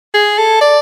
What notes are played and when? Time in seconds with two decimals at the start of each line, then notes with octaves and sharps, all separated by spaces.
0.14 G#4
0.38 A4
0.61 D5